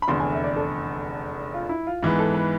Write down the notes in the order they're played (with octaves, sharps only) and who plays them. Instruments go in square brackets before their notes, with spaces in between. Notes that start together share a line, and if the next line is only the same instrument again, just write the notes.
[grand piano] B5
[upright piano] F1 E2 D3 [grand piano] C6
[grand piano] G#5
E5
D5
A4
F4
E4
F4
[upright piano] G#2 E3 B3 [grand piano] G#4
[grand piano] A4
B4